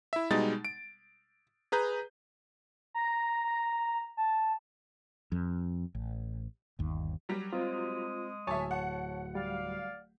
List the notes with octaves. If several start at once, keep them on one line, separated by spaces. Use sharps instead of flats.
E4 E5
B2 G3 G#3 D#4 A6
D7
G#4 B4 A#5 G6
A#5
A#5
A5
F2
A1
G1 D#2
F#3 G3
G#3 C4 F4 D#6
D1 C#5 E5 G#5 A5
F#5
G3 D5 F5